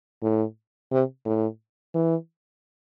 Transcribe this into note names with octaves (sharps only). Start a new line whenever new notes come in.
A2
C3
A2
E3